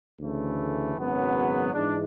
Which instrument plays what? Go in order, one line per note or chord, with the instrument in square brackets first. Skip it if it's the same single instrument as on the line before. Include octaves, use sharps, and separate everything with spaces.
[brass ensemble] D2 C#3 E3 A3
G#1 F#2 C#3 F#3 B3
G#2 E3 G#3 D4